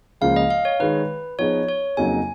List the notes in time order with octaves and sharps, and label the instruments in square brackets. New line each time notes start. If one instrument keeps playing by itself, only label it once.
[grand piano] C#2 C#3 F3 A#3 [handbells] F5
[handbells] D#5
F5
C#5
[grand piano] D#3 G#3 D#4 [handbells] B4
[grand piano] F3 B3 D#4 G#4 [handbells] C#5
[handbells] C#5
[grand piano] F2 C#3 F#3 A#3 D#4 [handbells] G#5